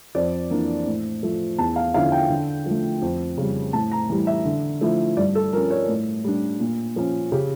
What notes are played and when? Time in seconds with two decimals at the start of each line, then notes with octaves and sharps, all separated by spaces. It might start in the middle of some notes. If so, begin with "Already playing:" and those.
0.15 F2 D5
0.50 E3 A#3 D4
0.87 A2
1.23 F3 A3
1.58 E2 A5
1.76 F5
1.94 D3 F3 C#4 E4 F5
2.12 G5
2.30 D3
2.66 F3 A3
3.02 F2
3.37 C#3 G3
3.73 A2 A5
3.92 A#5
4.10 E3 G3
4.27 E5
4.45 D3
4.81 F3 A3 E4
5.17 G2 D5
5.35 A4
5.53 F3 A#4
5.56 C#4
5.71 C#5
5.88 A2
6.24 G3 D4
6.60 A#2
6.96 F3 C#4
7.32 C#3 G4